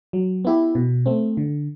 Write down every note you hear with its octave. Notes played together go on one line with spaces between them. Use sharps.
F#3
B3 E4 G4
B2
A3 C4
D3